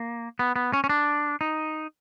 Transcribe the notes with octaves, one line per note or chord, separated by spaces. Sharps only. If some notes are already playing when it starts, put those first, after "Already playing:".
Already playing: A#3
B3
B3
C#4
C#4
D4
D#4